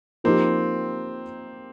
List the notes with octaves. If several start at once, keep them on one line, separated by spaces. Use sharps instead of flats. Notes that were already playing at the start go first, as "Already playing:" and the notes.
F3 A#3 C4 D#4 G4